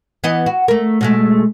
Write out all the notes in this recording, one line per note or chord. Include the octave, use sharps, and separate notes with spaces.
E3 B3 D#5
F#4
A3 A#4
B2 G#3 A3